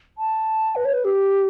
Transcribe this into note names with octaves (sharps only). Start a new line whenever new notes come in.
A5
B4
C#5
B4
G4